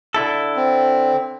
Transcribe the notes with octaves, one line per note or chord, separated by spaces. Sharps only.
D3 E4 A4
C4